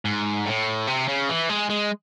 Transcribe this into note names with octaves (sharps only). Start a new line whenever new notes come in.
G#2
A2
C3
C#3
E3
G#3
G#3